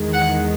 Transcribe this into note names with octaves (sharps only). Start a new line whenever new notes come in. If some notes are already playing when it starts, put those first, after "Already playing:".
Already playing: E2 D#3 G#3
F#5